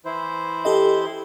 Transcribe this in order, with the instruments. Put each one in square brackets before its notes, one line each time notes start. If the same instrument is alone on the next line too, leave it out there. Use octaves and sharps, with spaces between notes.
[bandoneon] E3 E4 C5
[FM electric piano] G4 A4 D#5